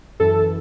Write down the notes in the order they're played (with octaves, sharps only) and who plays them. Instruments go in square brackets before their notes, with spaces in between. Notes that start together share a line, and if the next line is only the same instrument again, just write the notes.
[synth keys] F#2 E3 A4